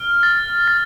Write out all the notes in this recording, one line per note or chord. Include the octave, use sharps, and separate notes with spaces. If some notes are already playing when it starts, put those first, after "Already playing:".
Already playing: F6
A6
A6